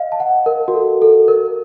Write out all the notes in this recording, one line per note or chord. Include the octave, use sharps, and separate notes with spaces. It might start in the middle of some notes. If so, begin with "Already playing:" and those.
Already playing: D#5 F5
A5
F#5
A#4
F#4
A4
A4
A#4